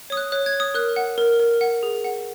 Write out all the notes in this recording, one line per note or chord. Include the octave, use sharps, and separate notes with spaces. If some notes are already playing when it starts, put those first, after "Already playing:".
C#5 D#6
F#6
C#5 F#6
G#6
C#5
D#6
A#4 F#6
F#5
A#4
A#4
F#5
G#4
F#5